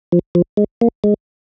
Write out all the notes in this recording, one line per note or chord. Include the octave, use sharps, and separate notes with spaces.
F3
F3
G#3
A#3
G#3